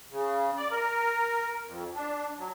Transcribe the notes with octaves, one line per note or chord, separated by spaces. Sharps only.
C#3
D5
A#4
F2
D4
F#3